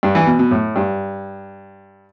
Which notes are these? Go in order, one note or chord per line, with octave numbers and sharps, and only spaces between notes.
G2
E3
B2
B2
A2
G2